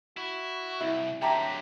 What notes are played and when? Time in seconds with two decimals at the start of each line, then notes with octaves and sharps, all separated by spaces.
0.17 E4 F#4
0.81 C2 E4
1.22 D3 F#3 G4 E5 G5 A5 A#5